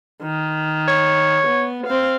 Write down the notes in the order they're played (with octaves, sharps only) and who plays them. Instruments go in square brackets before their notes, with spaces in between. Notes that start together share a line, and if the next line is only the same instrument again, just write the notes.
[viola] D#3
[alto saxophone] C#5
[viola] B3
C4 F5